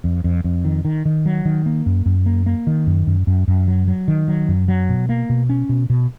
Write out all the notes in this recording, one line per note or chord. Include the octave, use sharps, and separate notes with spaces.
F2
F2
F2
D#3
D#3
D#3
F#3
D#3
A#3
F#2
F#2
A#3
A#3
D#3
F#2
F#2
F#2
F#2
F#3
F#3
D#3
F#3
F#2
F#3
B2
A#3
B2
C#4
B2
B2